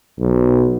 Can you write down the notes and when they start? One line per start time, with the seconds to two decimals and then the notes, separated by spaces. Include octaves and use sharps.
0.20 B1